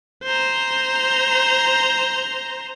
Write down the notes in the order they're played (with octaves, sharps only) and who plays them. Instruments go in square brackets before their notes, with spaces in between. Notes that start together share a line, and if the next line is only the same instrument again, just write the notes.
[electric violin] C5 A#5